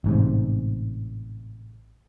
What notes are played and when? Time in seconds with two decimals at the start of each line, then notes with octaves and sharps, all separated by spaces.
0.04 A1 G#2 C3